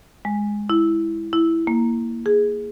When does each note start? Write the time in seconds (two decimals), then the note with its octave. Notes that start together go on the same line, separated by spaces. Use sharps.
0.25 G#3
0.70 E4
1.33 E4
1.67 A#3
2.26 G#4